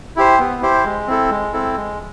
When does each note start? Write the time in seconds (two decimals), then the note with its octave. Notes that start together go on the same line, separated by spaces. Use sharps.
0.16 E4 G4 C5
0.39 B3
0.62 E4 G4 C5
0.85 G#3
1.07 C4 E4 A4
1.30 G#3
1.53 C4 E4 A4
1.76 G#3